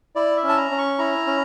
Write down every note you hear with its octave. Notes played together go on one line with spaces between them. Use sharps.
E4 D5
E5
C#4
A5
A#5
C#4
C#6
E4 A#5
C#4